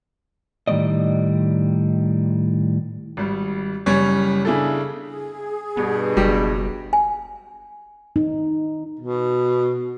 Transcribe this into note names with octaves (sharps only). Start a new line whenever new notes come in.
A2 D#3 G3 A3 D5 D#5
G#1 G3
F#1 G3 C#4 C#5 G#6
C#3 D4 E4 G#4 A4
G#4
G2 B2 B3
F#1 F#3 G3
G#5
D#4
B2